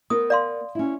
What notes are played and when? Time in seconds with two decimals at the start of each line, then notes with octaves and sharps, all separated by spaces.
0.10 B3 A#4 C5 D#6
0.30 D5 F5 C6
0.75 C#4 E4